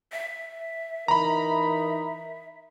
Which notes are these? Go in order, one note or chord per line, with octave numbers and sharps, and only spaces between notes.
E5
E3 D#4 A#4 A#5 B5